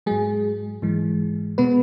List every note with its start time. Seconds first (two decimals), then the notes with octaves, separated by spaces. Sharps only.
0.06 G#2 F#3 G#3 G#4
0.82 G#2 E3 G#3
1.58 B2 G#3 B3 B4